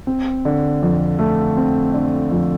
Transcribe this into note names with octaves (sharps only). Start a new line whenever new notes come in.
C4
D3
F2
A3
C4
D3
F2